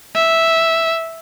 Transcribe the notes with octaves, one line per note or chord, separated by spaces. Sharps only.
E5